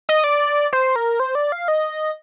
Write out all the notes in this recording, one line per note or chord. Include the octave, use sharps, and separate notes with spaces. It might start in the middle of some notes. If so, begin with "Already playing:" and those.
D#5
D5
C5
A#4
C5
D5
F5
D#5